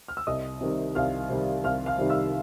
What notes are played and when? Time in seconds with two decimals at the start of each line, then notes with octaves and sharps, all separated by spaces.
0.08 F6
0.17 E6
0.27 C2 D#5 D#6
0.61 C3 D#3 G3
0.95 C2 F5 F6
1.29 C3 D#3 G3
1.64 C2 F5 F6
1.86 F5 F6
1.98 C3 D#3 G3
2.10 E5 E6